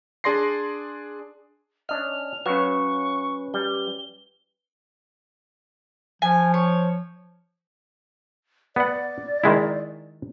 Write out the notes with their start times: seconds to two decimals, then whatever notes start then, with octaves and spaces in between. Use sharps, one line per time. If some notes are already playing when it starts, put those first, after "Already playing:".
0.24 D4 G#4 D5 C6 A#6 C7
1.89 C#4 D4 D#5 F6 F7
2.46 F#3 C#4 F#4 B4 F5 C#6
3.54 G3 G7
6.22 F3 G#5
6.54 C#5
8.76 B3 D5 F#5
9.44 D#3 G#3 E4